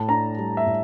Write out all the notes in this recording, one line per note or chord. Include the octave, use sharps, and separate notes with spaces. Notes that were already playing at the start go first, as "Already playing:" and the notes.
Already playing: A2 A5
D4 A#5
G3
E5
A2